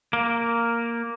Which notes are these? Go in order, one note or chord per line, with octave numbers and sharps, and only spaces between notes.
A#3